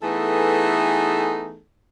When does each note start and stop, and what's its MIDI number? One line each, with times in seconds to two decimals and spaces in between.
0.03 1.59 52
0.03 1.59 57
0.03 1.59 59
0.03 1.59 63
0.03 1.59 68
0.03 1.59 69